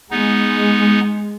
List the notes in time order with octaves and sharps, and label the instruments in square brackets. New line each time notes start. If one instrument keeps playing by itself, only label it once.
[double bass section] G#3 [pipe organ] B3 D#4